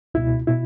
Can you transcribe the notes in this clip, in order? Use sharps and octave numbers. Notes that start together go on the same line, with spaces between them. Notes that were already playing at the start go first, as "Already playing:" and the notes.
C#2 B2 E4
B2 E4